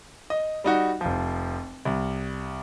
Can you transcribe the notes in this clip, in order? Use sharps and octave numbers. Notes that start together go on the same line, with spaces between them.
D#5
G3 D#4 F#4
F1 F3
C2